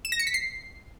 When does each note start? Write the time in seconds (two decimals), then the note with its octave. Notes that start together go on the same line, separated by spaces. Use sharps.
0.05 E7
0.12 A#6
0.19 C#7
0.27 B6
0.34 C7